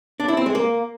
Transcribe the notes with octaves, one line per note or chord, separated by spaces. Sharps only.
D4
E4
C4
G#3
A#3